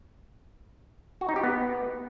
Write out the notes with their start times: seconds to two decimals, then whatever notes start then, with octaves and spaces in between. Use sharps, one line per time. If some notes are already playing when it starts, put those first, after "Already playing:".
1.21 F#4
1.29 D#4
1.36 G4
1.44 B3